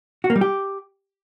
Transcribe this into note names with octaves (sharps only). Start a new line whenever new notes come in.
F#4
A#3
G3
G4